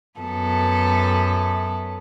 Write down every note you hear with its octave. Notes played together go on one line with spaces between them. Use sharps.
F#2 B3 A4